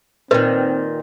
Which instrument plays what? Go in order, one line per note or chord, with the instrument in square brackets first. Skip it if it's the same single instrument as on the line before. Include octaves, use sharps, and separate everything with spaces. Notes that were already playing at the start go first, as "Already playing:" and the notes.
[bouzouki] A#2 D#3 [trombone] C4 [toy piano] B4